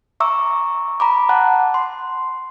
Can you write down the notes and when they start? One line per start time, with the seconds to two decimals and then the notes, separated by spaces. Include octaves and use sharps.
0.20 E5 A#5 C#6 D6 E6
1.00 A#5 B5 D6
1.29 F#5 A5 F#6
1.74 C6